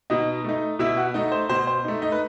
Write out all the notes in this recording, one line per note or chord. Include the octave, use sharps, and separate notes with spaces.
B2 D#4 D#5
A3 D#4
B2 E4 E5
F#4 F#5
A3 D#4 D#5
C5
B2 C5
C5
A3 D#4
D#4 D#5
B4